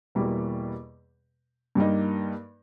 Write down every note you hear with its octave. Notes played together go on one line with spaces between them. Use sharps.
E2 B2 G3 A#3
G2 G3 A#3 D#4